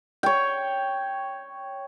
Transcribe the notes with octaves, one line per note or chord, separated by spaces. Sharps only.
C#5 G5